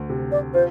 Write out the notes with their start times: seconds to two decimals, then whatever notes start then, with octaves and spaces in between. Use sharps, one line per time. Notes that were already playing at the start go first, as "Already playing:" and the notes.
Already playing: D2
0.10 C3
0.32 D5
0.54 F4 C5